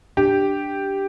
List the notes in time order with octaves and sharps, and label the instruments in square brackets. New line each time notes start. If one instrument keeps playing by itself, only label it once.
[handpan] D4 [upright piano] G4